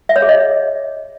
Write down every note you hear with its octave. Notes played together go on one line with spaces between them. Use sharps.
E5
C#5
G#4
D#5